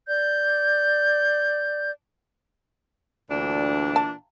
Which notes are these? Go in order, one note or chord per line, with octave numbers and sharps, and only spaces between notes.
D5 G6
D2 A#2 E3 D4
A5